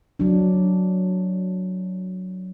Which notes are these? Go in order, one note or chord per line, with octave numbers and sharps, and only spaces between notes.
F#3 D4